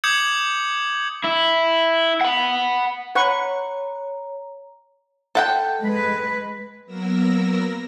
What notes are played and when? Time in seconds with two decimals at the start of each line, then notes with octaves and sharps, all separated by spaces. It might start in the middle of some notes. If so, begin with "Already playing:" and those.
0.04 D6 D#6 G6 G#6 C#7 F#7
1.24 E4
2.21 F#5 B5
3.15 B4 C#5 F#5 A#5 C#6
5.35 A4 F#5 G5
5.82 G#3 B4
6.86 F#3 A#3 B3 A#4 E6 A#6